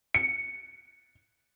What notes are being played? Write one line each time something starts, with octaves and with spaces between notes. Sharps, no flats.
C#7